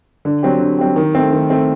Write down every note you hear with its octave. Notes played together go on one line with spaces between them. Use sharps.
D3
F#3 C4 G4
D3
F#3 C4 G4
D#3
A3 C4
D#3
A3 C4